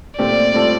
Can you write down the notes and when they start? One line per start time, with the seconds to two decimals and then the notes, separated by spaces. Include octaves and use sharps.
0.18 A#2 A3 C4 G4 D5
0.54 A2 G3 C4 F4 A4